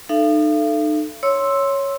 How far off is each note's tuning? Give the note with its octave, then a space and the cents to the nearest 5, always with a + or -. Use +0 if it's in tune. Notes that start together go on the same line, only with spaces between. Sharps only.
D#4 -35 A4 +0 F5 -45
C#5 +0 C6 +10 E6 +0